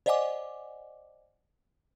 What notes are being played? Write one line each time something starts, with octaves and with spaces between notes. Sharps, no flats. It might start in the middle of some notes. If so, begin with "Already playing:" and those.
C5 D5 D#5 F#5 G#5 D6